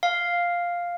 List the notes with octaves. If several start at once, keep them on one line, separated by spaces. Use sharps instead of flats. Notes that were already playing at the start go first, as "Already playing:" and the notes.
F5